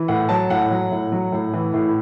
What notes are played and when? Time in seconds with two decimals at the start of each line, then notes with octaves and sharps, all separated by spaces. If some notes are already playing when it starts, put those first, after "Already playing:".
Already playing: E3
0.08 A2 F#5
0.29 F#3 A5
0.50 A2 F#5
0.70 F#3
0.91 A2
1.12 F#3
1.32 A2
1.53 E3
1.74 A2